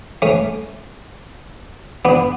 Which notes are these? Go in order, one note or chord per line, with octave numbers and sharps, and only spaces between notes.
A3 C#4
B3 D4